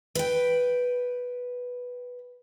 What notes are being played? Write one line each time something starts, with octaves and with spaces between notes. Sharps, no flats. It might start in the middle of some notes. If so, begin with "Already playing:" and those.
B4 G5